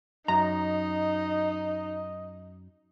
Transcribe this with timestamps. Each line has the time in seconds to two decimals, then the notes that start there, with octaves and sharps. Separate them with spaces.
0.28 F#2 D#4 D#5 A#5